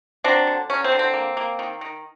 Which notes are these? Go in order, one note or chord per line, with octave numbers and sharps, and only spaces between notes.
F#3 C4 D4
D3
F#3 C#4
C4
D3
C4
A#3
A#3
D#3
D#3